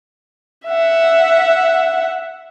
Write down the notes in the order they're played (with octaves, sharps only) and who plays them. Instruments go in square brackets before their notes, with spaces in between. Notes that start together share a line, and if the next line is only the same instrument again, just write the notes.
[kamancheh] E5 F#5